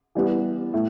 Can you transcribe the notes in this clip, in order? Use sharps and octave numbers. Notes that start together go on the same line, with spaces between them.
E3 G3 B3
A2